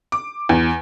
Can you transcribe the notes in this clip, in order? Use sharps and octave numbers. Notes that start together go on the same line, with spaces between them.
D6
E2